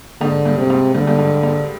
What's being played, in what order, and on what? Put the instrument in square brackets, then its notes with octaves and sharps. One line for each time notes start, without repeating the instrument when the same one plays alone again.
[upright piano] G#2 [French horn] D3
[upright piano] G2
[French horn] C3
[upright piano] G#2
[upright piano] G2 [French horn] D3
[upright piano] G2
G#2
G#2